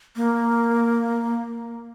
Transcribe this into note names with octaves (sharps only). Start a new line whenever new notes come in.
A#3